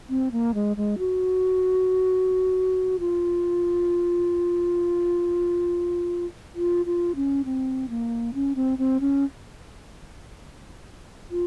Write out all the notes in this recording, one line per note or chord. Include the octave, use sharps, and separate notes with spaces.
C4
A#3
G#3
G#3
F#4
F4
F4
F4
C#4
C4
A#3
C#4
C4
C4
C#4
F4